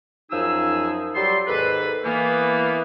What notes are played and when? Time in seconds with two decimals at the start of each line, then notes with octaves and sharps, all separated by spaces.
0.32 F#2 F3 D#4 G#4 E6
1.15 F#3 G3 G4 A4 C6
1.47 D#2 G#2 A4 B4
2.05 E3 A#3 B3